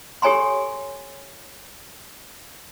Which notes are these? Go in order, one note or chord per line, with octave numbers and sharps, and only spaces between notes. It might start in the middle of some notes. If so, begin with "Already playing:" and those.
G4 A4 C#5 G#5 A#5 C6